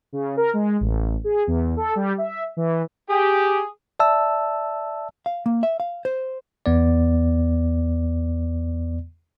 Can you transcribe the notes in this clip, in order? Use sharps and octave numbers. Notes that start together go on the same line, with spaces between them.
C#3
A#4
G#3
A1
G#4
E2
A4
G3
E5
E3
G4 G#4
D5 E5 A5 E6
F5
A#3
E5
F5
C5
E2 B3 D5